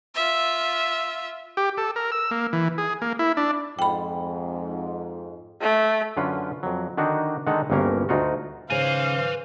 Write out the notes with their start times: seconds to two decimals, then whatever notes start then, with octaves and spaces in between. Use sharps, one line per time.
0.14 F4 E5
1.57 G4
1.77 A4
1.96 A#4
2.12 E6
2.31 A#3
2.53 E3
2.78 G#4
3.02 A#3
3.19 E4
3.37 D4
3.79 F2 G#2 G5 B5
5.61 A3
6.17 F#2 D3 C#4 F4 B4
6.63 F2 F#3
6.97 D3 D#3 D4 D#4 F#4
7.47 D3 D#3 G#3 D#4 A4 F#5
7.70 G1 D2 G2 A#3 C#4 A#4
8.09 D2 D#4 F4 F#4
8.70 G#2 C#3 C#4 B4 C5 F5 G#5